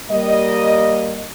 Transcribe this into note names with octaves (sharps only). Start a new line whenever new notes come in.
G3 A#3 D#5